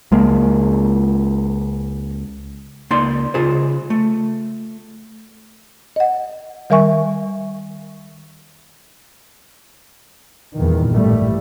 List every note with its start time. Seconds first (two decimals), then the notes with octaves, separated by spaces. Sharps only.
0.12 C#2 G#3 A#3
2.90 C#2 A#3 D#4 D5 C6
3.34 C#3 F4 G#4 C5
3.90 A3
5.96 D#5 F#5
6.70 D#3 G3 A#4 E5 G#5 C#6
10.56 E2 G2 A#2 D#3
10.93 A1 G3 A3